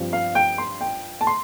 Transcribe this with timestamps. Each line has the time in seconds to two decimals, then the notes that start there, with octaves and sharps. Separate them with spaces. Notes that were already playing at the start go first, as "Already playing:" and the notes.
Already playing: G2 F3 C4
0.13 F5
0.35 G5
0.58 C6
0.81 G5
1.21 A5
1.27 C6